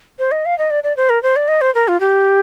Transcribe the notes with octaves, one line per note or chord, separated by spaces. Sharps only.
C5
D#5
F5
D#5
D5
D5
C5
A#4
C5
D5
D#5
C5
A#4
F4
G4